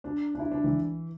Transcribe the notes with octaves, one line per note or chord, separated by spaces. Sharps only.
D4
D4
E4
D4
E3